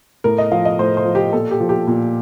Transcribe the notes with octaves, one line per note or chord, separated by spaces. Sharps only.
A2 A#4
D#5
F3 F5
D#5
A2 C5
C5
F3
G4
A#2 A4
G4
F3
G4
A#2